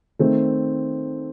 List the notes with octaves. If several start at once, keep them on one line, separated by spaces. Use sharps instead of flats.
D#3 A3 C4